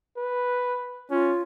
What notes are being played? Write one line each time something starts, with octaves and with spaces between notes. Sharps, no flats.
B4
C#4 F4